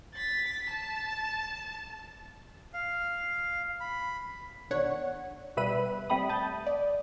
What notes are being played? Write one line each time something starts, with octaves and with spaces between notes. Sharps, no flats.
A6 B6
A5
F5
B5
G#1 B2 D4 C#5 F#5
B2 G3 B4 E5 B5 D#7
G3 A3 C4 B5 D#6
A5 D#6 G6 A6
D5